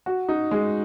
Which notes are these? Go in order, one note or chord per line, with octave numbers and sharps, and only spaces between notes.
F#4
D#4
G#3